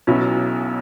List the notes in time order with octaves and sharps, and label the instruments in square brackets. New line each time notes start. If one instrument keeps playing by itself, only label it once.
[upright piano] B1 B2 F#3 C#4 E4